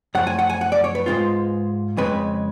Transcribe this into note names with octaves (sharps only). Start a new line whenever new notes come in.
F#2 F3 A3 F#5
G#5
F#5
G#5
F#5
D5
C#5
B4
G#2 G#3 C#4 F4
F2 C#3 G#3 B4